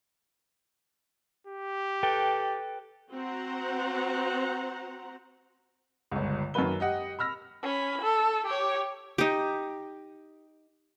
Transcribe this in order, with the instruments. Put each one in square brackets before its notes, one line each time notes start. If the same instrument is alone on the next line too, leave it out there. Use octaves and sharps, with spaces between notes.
[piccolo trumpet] G4
[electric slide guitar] A4 B4 G5
[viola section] C4 F#4 C5 F#5 A#5
[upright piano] G1 C#2
F#2 D#3 A#3 F#4 B4 G7
G4 D#5 F#5
B5 E6 F6 A#6
[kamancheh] C#4 B5
A4
G4 C#5
[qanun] D#4 G4